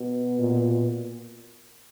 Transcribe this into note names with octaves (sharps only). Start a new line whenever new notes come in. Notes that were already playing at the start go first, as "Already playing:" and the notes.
Already playing: B2
A#2